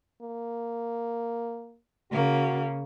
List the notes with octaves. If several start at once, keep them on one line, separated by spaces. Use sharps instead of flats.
A#3
C#3 A#3 F#4